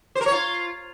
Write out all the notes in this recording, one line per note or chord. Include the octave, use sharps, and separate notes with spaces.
C5
A#4
C#5
F4